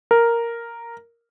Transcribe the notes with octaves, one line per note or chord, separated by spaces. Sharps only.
A#4